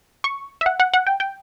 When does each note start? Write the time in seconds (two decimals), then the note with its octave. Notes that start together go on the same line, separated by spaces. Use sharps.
0.24 C#6
0.61 E5
0.66 F#5
0.80 F#5
0.94 F#5
1.07 G5
1.20 G5